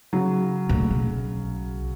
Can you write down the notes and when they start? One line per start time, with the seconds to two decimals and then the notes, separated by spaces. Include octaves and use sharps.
0.13 C#3 F#3
0.69 D2 A#2
0.91 B1